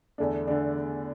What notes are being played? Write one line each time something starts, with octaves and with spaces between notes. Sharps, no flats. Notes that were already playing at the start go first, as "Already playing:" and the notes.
E2 D3 A3 D4
D3 A3 D4